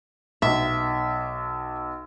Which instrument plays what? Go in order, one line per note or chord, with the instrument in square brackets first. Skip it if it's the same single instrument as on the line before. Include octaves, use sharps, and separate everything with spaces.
[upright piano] B1 [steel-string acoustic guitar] E5